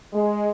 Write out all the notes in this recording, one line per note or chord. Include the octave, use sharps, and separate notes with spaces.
G#3